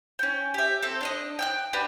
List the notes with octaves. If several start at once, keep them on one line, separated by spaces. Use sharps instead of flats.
C#4 G5
G4 E5
C4 A4
D4 C#5 D#5
G5 E6 F#6
D4 F#4 G4 B4